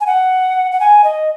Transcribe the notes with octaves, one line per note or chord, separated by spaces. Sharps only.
G#5
F#5
F#5
G#5
D#5